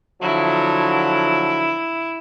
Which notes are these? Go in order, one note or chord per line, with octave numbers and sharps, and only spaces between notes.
D3 F3 F#3 E4